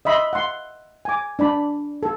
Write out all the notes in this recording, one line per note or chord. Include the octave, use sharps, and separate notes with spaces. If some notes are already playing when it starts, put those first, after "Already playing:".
D#5 E5 B5 C6
F#5 C6
G#5 D6
D4 D5 B5
A4